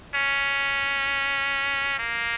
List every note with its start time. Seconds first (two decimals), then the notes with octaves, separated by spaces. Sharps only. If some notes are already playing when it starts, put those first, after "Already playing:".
0.15 C#4
1.99 A#3